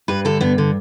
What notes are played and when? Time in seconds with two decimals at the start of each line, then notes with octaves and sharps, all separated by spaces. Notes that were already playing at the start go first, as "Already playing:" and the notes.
0.08 G2 B4
0.25 D3 A4
0.41 G2 B3
0.58 D3